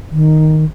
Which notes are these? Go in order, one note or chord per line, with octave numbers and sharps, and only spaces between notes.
D#3